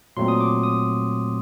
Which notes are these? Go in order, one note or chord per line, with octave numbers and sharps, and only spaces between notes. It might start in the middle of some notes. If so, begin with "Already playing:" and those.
A#2 F#3 A3 C4 C6
D#6
D6
D#6